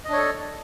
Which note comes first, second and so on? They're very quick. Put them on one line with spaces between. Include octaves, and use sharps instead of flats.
D#5 D4 C#5 A4